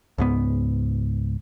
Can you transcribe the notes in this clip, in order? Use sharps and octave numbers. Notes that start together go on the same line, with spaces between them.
C#2 G#2 B3